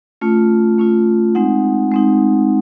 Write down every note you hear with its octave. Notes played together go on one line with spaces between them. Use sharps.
A3 C#4 F4
A3 C#4 F4
G#3 C4 D#4 F#5
G#3 C4 D#4